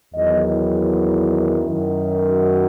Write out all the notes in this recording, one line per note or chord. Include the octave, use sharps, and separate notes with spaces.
E2 D#3 F#3 D#5
E4
F#2 D#3 F#3
F#4